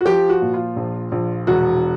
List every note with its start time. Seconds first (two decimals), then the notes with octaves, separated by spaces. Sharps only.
0.01 F#4
0.05 F3 G4
0.29 F#4
0.42 A#2
0.54 F4
0.76 A#1
1.12 A#1
1.47 E1 F#4